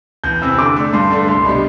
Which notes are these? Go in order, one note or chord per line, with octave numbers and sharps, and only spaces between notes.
E2 G6
C3 E3 E6
D3 D6
A3 D4
G2 C6
D3 A3 D4
C2 C6
B2 G3 D4 G4 B5